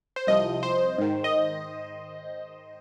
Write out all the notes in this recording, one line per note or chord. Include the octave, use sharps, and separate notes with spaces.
C5
C2 C3 F3 D#5
C5
G#2 D#3
D#5